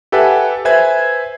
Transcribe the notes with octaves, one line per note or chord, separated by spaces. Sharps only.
G4 A4 B4 E5 F#5 G#5
B4 C5 E5 G#5 G#6